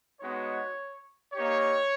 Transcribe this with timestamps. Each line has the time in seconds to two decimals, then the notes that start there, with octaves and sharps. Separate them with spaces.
0.19 G#3 B3 D#4 F#4 C#5
1.33 A#3 D#4 G4 C#5